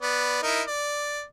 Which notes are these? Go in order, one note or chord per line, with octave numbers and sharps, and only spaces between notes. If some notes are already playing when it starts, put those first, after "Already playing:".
B3 D5
D#4 E4 A#4
D5